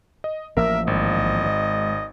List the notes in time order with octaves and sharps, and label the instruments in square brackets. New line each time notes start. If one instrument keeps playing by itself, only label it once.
[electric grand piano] D#5
[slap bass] A1 F3 A#3 [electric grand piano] A#4 [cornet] E5
[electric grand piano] G#1 [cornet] D#5
[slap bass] G#3